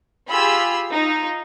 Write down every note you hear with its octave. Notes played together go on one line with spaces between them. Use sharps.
F4 G4 G#4 B5 E6
D#4 F4